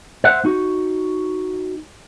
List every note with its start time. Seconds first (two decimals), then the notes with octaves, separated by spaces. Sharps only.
0.24 C5 E5 F#5
0.45 D#4 F#4